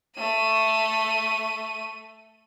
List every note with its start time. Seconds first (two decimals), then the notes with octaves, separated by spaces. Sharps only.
0.16 A3 D#7